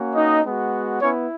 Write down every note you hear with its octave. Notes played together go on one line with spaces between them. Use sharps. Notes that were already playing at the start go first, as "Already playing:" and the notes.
Already playing: A#3 C#4 F#4
D#4 D#5
G#3 B3 F#4
B3 C#4 E4 C#5